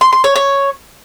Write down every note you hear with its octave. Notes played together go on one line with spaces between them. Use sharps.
C6
C6
C#5
C#5